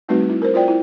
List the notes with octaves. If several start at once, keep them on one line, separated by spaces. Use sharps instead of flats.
G3 A3 C4 D#4 F#4 B4
E4
A#4 C5
F4 C5 D5 G5
E4